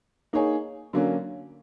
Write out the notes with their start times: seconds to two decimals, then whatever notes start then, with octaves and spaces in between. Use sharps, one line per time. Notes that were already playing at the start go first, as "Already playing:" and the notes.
0.33 A#3 D#4 G#4 C#5
0.93 D3 F#3 A#3 C#4